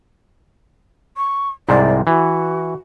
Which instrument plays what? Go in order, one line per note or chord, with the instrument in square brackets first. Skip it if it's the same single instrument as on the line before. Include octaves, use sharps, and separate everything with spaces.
[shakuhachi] C#6
[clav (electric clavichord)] C2 G#2 C3 [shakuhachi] D5
[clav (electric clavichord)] E3 [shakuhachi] F#4